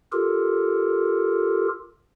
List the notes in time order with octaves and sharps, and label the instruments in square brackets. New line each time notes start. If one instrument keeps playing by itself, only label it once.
[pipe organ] F4 G4 A4 A#4